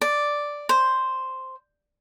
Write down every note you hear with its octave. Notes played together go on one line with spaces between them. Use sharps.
D5
C5